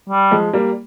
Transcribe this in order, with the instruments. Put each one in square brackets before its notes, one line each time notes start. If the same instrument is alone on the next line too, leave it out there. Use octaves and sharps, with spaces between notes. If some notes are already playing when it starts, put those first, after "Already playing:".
[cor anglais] G3
[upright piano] F3 G#3
G3 A#3